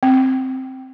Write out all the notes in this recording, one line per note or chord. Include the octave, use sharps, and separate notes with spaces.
C4